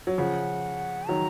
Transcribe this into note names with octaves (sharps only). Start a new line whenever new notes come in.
F#3
C#3 F3 F#5
D#3 F#3 A#5